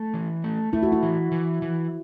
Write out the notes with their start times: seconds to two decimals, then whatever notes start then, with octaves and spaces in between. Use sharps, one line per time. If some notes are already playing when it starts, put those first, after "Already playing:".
Already playing: A3
0.14 E3
0.44 A3
0.73 A3 E4
0.83 F#4
0.92 E4
1.03 E3
1.32 E3
1.62 E3